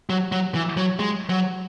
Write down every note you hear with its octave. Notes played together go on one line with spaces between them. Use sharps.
F#3
F#3
E3
F#3
G#3
F#3